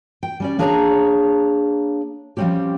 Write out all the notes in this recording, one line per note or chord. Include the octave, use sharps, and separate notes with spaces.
G5
G3 C#4 D5
A#3 D4 G#4 C#5 A5 A#5
F3 G3 A3 C4 C#4 G4